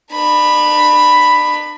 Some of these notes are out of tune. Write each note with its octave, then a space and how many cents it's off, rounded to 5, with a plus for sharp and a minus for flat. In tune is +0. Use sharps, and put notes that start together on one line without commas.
D4 +45 B5 +0